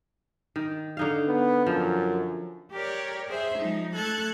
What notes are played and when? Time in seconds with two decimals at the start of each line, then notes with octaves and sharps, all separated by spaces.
0.56 D#3
0.97 D3 D#4 F5
1.27 B3
1.67 F#2 F3
2.72 G4 A#4 C#5 D5
3.29 G#4 C5 E5
3.59 F3 G#3 D#4
3.95 A3 A4 A5 F#6 G#6